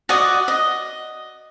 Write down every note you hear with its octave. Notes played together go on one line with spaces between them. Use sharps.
F#4 D5 D#5 F#5
D#5